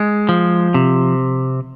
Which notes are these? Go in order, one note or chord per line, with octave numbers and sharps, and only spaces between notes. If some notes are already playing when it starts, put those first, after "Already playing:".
Already playing: G#3
F3
C3